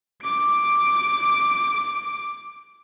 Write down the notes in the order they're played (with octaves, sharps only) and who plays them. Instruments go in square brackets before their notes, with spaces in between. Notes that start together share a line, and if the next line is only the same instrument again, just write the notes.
[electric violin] D6 D7